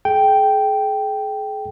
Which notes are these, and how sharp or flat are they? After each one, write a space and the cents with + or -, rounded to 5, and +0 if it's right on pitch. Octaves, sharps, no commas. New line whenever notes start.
G#4 +40 G5 -5